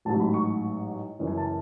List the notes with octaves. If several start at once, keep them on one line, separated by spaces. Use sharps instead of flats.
A1 G#2 F#3 A5
B5
C#6
F#1 F#2 E3
G#5
A5